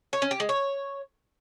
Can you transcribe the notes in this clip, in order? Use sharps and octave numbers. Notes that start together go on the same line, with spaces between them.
C#5
C#4
G4
G#3
C#5